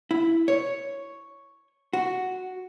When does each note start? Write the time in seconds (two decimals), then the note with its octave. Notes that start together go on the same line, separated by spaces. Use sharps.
0.11 E4
0.48 C#5
1.93 F#4